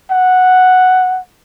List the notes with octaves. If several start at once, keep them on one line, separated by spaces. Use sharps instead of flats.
F#5